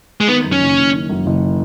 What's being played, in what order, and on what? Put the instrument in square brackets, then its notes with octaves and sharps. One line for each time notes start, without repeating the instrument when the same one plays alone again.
[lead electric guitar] G#3
[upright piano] D#3 [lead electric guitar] B3
[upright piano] F#2
[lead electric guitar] C#4
[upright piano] F#1
F#1
D#3
F#2
F#1